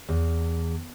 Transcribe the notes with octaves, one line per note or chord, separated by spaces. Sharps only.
E2